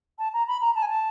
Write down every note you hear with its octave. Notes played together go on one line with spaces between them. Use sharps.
A5
A#5
B5
A#5
A5
G#5
A5